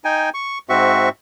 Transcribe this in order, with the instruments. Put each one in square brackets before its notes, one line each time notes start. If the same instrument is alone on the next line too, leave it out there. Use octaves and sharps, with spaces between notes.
[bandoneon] D#4 G5 G#5
C#6
G#2 C4 F#4 E5 C#6